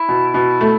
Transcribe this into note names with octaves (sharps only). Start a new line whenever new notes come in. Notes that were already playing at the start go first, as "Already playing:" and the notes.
Already playing: E4
B2
B2
A3